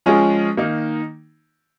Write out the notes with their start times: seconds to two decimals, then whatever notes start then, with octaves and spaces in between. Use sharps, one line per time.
0.06 F3 G#3 C#4 F4 G#4
0.57 D#3 A#3 D#4